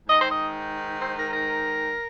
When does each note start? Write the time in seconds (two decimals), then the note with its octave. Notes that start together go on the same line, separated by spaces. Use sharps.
0.07 G#2 D#3 D#5
0.20 C5
0.31 D#5
1.01 C5
1.18 A#4
1.33 A#4